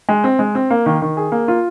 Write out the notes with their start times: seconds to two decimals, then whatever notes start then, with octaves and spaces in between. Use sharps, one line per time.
0.09 G#3
0.24 C4
0.39 G#3
0.55 C4
0.70 A#3
0.86 D#3
1.02 D#3
1.17 G#4
1.32 A#3
1.48 F4